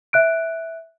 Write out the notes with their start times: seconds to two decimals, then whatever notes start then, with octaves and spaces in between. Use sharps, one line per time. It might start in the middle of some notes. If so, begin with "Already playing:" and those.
0.13 E5 F#6 D7